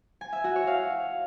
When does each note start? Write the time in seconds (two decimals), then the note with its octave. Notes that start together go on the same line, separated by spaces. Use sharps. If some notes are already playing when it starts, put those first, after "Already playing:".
0.21 G#5
0.33 E5
0.44 F#4
0.56 C#5
0.67 F5